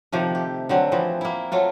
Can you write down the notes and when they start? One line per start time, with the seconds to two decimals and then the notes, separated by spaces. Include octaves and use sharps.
0.12 C3 D#3 F3 A3
0.35 G4
0.69 D3 F#3 C4
0.92 E3 F3 C4
1.21 A#3 E4
1.52 F#3 A3 F4